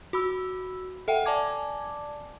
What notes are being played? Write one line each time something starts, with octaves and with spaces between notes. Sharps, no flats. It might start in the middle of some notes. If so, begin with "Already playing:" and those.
F#4 B5 E6
A4 E5 F#5 G5
D5 G#5 A5 D6 G#6